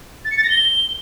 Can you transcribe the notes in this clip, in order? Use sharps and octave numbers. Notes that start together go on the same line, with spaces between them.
A6
C#7
A6
A#6
G7